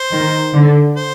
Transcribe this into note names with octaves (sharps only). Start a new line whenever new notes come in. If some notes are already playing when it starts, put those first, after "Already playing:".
Already playing: C5
D#3
D3
C5